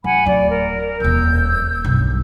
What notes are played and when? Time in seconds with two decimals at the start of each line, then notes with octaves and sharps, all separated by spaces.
0.04 F#2 F#5 G#5 B5
0.26 D1 F#3 D5
0.49 A#4
1.00 D#1 F2 E6 G6
1.84 B1 G2